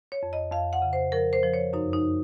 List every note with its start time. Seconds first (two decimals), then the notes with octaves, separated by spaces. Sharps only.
0.12 C#5
0.23 F2
0.33 D#5
0.52 F2 F5
0.73 F#5
0.82 C#3
0.93 C5
1.12 F3 A#4
1.33 C5
1.43 F3
1.54 C#5
1.73 F#2 D#4
1.93 D#4